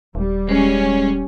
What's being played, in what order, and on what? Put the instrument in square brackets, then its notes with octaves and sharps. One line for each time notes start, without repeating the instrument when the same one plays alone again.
[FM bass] D#1 [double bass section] G3
[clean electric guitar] G#3 [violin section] C#4